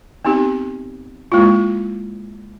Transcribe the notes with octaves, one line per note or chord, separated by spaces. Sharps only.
B3 C4 D#4 G4
G#3 A#3 E4 F4